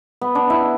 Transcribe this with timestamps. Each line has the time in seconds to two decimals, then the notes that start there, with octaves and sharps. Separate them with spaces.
0.21 B3
0.35 D4
0.50 E4